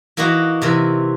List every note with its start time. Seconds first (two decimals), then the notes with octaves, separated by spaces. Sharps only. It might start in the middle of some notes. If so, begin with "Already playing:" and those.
0.17 E3 A#3 D#4 E4 F#4
0.62 C3 E3 A#4